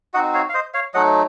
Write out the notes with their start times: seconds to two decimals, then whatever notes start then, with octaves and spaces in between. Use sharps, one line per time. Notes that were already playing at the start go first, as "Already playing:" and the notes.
0.14 C4 D#4 F#4 D#5 F#5
0.34 C#5 F5
0.49 F5
0.54 C5 D#5
0.74 C#5 F5
0.94 F#3 A3 D#4 D#5 F#5